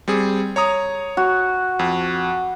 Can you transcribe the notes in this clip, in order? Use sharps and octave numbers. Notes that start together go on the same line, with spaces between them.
G3 C4 G#4
C#5 A#5 D#6
F#4
F2